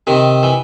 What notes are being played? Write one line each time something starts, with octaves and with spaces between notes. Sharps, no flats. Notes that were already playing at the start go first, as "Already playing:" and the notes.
C3 D#3
E3